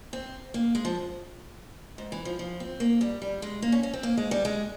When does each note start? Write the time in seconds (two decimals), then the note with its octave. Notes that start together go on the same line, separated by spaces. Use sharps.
0.13 C4
0.54 A#3
0.75 G#3
0.85 F3
1.98 G#2
2.12 E3
2.25 F3
2.39 F3
2.60 C4
2.80 A#3
3.01 G3
3.22 G3
3.42 G#3
3.62 A#3
3.72 C#4
3.83 C#4
3.93 C4
4.03 A#3
4.17 G#3
4.31 G3
4.45 G#3